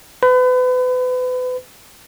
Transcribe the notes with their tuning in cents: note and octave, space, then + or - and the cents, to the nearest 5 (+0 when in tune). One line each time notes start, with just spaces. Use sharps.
B4 +35